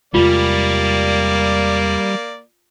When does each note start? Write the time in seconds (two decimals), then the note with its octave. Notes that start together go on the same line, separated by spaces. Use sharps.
0.14 E2 C3 G3 G#3 A#3 F4 D5